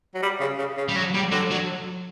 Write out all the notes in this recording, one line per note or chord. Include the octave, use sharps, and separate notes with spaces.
F#3
G3
C#3
C#3
C#3
G3
F#3
G3
D3 F#3
F#3